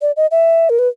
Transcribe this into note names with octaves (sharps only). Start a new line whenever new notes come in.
D5
D#5
E5
A#4
B4